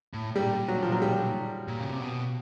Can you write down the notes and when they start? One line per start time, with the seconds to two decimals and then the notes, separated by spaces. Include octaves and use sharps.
0.14 A2
0.36 A#2 G3
0.68 F#3
0.83 F3
0.92 F#3
1.02 G3
1.68 A#2
1.80 C#3
1.90 C3
2.01 B2